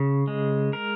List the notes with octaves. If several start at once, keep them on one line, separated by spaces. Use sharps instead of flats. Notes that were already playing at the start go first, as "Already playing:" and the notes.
Already playing: C#3
G#3
A#4